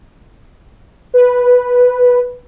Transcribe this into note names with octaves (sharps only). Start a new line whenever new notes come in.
B4